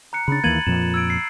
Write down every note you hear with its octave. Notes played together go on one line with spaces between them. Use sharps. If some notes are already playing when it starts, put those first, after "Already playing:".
A#5 F#6 C#7
C#3 D4 B5 A6
D#2 E3 A#3 G#6 D#7 F#7
F2 A#2 F3 E7
E6 G#6 D7
C7